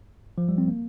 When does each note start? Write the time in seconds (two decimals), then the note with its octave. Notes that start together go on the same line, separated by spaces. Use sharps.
0.38 F3
0.49 G3
0.58 C4
0.68 A#3